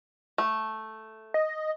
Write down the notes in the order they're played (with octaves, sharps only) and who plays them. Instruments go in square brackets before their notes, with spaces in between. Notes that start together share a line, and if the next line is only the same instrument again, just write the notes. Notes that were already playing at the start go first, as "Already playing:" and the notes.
[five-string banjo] A3
[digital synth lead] D#5